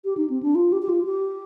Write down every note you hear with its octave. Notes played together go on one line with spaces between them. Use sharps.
G4
D#4
C4
D4
F4
G4
G4
F4
G4